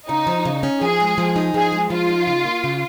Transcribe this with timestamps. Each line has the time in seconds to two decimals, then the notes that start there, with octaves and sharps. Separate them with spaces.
0.08 C#3 D#4
0.27 F3
0.45 C#3
0.63 C#4
0.81 F3 G#4
1.00 G#3
1.18 F3
1.36 D#4
1.54 F3 G#4
1.72 G#3
1.90 F3 F4
2.09 D#4
2.27 C#3
2.45 A#3
2.64 C#3